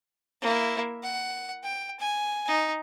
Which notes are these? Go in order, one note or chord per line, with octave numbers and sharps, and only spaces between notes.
A#3 E4
F#5
G5
G#5
D#4